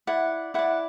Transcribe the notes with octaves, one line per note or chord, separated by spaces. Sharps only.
E4 D5 F#5
E4 D5 F#5